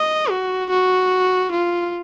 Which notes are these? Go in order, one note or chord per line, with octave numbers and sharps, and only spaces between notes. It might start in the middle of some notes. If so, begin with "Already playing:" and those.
Already playing: D#5
F#4
F#4
F4